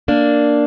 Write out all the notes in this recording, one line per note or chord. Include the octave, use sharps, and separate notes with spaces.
A#3 D4